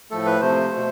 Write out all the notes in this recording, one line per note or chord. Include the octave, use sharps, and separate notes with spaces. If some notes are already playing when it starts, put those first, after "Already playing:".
A2 F3 A3 A4
B4
C3 F3 A3 C5
B2 A3